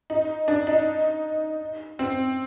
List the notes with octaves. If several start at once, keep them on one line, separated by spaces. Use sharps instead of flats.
D#4
D4
D#4
C4